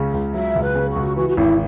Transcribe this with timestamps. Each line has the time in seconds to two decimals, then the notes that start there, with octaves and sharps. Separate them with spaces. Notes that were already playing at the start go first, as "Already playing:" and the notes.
Already playing: C#2 C#3
0.13 C#2
0.34 F#3 E5
0.56 C#2
0.62 B4
0.75 C#3
0.89 F#4
0.96 C#2
1.16 E3 F#4
1.28 F#4
1.36 G#1 E4